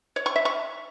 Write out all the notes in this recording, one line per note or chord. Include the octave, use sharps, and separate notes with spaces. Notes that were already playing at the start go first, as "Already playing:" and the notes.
C#5
C#6
E5
C#6